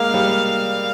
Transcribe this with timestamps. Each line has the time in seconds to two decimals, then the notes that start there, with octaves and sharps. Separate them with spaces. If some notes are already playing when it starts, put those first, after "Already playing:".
Already playing: G#3 A#3 F5
0.14 G3